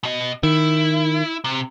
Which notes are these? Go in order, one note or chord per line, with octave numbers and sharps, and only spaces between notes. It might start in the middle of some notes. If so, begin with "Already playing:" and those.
B2 D#5
D#3 E4
C3